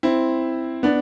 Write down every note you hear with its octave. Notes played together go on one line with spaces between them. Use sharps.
C4 E4
B3 D4